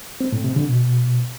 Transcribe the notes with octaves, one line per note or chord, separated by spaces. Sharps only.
C4
A2
C3
D3
B2